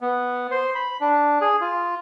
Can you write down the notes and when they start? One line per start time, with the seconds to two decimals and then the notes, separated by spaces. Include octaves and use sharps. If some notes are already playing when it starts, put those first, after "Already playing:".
0.01 B3
0.51 C5
0.75 B5
1.01 D4
1.41 G#4
1.61 F4